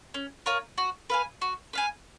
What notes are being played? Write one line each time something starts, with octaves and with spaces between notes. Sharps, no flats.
C#4
F4 A#4 C#5
F#4
B4 F5 G#5
F#4
B4 F5 G#5